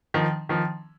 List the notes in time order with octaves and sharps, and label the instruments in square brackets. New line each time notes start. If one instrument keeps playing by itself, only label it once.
[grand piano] D#3 F3
D#3 F3